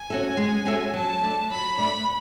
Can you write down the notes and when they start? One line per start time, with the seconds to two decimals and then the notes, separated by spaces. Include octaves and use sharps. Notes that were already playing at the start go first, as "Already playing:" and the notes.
Already playing: G#5
0.10 C#4 F#4 A4 E5
0.37 G#3
0.65 C#4 F#4 A4 E5
0.94 F#3 A5
1.22 A3 D4 A4 D5
1.50 F#3 B5
1.78 A3 D4 A4 D5 B5